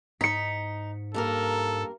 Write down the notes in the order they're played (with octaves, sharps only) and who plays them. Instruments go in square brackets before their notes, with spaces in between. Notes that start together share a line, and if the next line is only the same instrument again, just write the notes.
[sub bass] G#2 [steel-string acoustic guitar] D#4 [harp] B6 C#7
[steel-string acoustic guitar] G2 A#3 A#4 [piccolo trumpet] A4